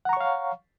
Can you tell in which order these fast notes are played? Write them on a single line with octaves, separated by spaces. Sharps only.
F#5 A#5 C#6 C#5 F5